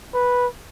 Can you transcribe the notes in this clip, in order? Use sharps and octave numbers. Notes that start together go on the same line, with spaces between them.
B4